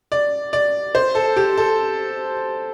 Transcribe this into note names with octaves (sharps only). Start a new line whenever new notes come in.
D5
D5
C5
A4
G4
A4